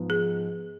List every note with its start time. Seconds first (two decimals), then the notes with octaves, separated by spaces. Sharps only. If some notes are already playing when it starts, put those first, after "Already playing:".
Already playing: G#2 F3 B3
0.10 G#4